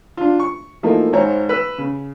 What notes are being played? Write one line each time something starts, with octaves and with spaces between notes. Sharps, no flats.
D4 F4
C#6
E3 F3 A3 A#3 D#4
G#1 G#2 C5 C#5 A#5
B4 E6
C#3